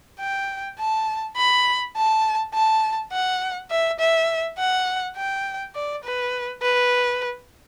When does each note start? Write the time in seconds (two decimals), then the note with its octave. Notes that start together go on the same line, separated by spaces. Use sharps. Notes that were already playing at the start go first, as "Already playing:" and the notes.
0.20 G5
0.79 A5
1.36 B5
1.96 A5
2.54 A5
3.12 F#5
3.70 E5
3.99 E5
4.58 F#5
5.16 G5
5.75 D5
6.04 B4
6.62 B4